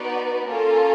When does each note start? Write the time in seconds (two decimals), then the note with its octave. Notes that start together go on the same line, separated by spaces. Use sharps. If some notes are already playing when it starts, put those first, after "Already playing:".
Already playing: B3 D#4 F#4 B4 D5
0.47 A#3 C#4 F4 A4